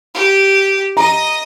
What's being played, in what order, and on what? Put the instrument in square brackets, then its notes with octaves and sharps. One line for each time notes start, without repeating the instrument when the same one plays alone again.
[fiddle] G4
[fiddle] D#5 [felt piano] A#5